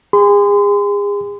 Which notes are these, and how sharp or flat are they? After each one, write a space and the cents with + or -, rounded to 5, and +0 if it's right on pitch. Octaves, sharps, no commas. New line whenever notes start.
G#4 -35 C6 -35